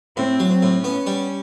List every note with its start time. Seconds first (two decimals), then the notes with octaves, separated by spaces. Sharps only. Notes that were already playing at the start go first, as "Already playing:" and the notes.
0.17 A2 C4
0.40 F#3
0.51 C4
0.63 A2
0.84 B3 C#4
1.07 G3